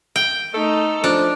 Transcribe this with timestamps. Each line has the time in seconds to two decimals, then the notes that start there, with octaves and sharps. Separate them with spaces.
0.16 G5
0.54 A3 D#4 A4
1.04 F3 D4